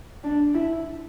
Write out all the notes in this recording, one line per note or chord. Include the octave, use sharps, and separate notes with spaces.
D4
E4